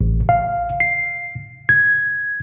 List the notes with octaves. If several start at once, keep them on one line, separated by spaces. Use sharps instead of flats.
A1
F5
C7
G#6